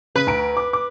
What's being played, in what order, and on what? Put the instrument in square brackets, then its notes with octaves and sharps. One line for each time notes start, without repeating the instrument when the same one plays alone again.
[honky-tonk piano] C#3 [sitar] B4
[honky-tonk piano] D2 A#5 D7
D6
D6